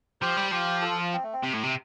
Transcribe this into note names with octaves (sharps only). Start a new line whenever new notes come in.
F3 G4 C5
G3
F3 G4 C5
F4 A4
F4
C4
A3
C4
C3
A2
C3